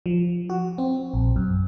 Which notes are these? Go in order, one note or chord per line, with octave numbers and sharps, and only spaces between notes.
F3
F#4
C4
A#1
F#2